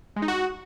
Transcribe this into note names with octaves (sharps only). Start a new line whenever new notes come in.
G#3
D#4
F#4